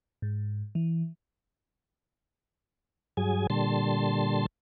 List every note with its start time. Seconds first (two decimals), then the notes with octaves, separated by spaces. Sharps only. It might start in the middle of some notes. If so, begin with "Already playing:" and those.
0.22 G#2
0.75 E3
3.17 G2 F#3 G#4 G#5
3.50 A#2 D3 G3 A5 C6